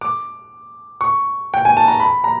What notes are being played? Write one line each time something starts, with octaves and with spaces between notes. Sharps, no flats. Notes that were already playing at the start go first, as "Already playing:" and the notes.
D6
C#6
G5
G#5
A5
A#5
B5
A#5